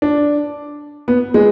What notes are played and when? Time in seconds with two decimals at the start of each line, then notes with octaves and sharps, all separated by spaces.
0.02 D4
1.08 B3
1.34 G#3